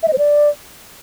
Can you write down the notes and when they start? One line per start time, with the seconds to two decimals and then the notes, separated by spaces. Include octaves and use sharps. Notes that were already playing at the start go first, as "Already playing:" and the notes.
0.03 E5
0.08 D#5
0.13 C5
0.18 D5